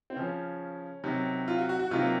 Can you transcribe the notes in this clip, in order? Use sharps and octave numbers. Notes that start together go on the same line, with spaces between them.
C4
C#3 F3 C#4
C3 D#3 F#3
F4
F#4
F#4
F#4
C3 D#3 F#3 F4
A#3